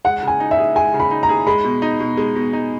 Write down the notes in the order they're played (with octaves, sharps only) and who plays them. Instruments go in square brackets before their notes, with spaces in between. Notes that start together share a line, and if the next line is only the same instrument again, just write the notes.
[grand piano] G#3 [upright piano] F#5
[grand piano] C#3 [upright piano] G#5
[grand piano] D#4
[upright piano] E5
[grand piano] G#4
[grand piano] G#3 [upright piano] G#5
[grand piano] C#3
[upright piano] B5
[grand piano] D#4
[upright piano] A#5
[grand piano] G#4
[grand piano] G#3 [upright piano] B5
[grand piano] B2
D#4
B2
G#3
B2
D#4